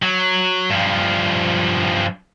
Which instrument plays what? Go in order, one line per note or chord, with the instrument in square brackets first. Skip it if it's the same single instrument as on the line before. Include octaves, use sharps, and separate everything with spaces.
[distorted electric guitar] F#3
G2 F3